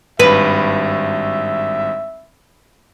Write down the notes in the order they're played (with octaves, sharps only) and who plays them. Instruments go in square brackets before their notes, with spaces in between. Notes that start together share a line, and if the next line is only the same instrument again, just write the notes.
[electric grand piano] G#1 G2 [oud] B4 [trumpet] E5